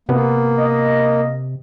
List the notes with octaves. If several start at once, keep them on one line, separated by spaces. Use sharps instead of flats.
C3 A#3 B3
D#5